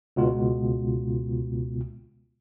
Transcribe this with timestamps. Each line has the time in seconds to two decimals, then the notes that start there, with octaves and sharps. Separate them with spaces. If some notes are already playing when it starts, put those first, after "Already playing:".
0.16 C#2 B2 B3 F4